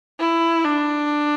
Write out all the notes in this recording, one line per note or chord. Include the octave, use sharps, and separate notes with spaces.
E4
D4